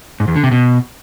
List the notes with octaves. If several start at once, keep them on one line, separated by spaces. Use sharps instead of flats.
G#2
E2
D3
C3
B2